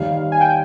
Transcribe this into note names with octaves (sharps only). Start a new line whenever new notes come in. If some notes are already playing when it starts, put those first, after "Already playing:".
Already playing: D#2 D#3 G3 F5
G#5
G5